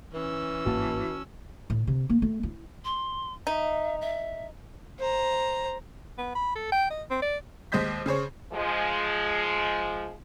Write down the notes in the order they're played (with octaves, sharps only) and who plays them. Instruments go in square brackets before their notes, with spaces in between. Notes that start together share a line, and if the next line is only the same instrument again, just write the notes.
[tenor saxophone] E3 [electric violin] C#4 E6
[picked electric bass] G1 G#2 A#3 [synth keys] F#4 A5
[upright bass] A2
C3
A#3
A3
E4
[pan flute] C6
[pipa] D#4 [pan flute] E5
[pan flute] E5
[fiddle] C5 A#5
[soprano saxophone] B3
B5
A4
G5
D#5
C4
D5
[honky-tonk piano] D#2 G#3 C5 D#5 G6 B6
C#3 G#4 C5 C#5
[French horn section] F3 G#3